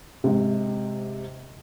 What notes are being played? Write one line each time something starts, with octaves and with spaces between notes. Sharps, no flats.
G#2 C3